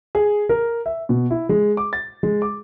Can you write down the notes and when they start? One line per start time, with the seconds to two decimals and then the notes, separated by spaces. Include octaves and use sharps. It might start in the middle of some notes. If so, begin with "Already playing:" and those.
0.15 G#4
0.49 A#4
0.86 E5
1.09 B2
1.31 E4
1.49 G#3
1.77 D6
1.93 A6
2.23 G#3
2.42 D6